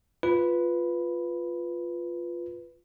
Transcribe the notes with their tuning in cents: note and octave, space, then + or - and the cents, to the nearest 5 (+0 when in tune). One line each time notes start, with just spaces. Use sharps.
F4 +0 B4 +0